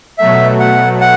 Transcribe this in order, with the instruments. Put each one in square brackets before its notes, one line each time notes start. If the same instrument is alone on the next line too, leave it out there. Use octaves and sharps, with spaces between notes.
[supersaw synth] B2 F#3 A3 [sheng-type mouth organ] E5
[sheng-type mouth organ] F#5
F#5